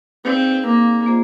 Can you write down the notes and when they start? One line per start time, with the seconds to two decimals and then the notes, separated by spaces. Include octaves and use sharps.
0.24 C4 D#4 G#4 D5 F5
0.66 A#3
1.06 A#3 F4 G#4 C5 D#5